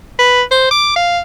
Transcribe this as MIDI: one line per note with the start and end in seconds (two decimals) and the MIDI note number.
0.19 0.42 71
0.51 0.71 72
0.71 0.96 86
0.96 1.20 77